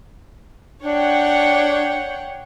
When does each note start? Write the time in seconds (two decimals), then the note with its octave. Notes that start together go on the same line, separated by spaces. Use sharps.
0.83 D4 C#5 F#5 G5